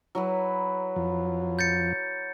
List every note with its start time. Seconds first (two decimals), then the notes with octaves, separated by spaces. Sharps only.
0.15 F#3 E4 B4
0.96 F2 F3
1.59 G6 A6 C#7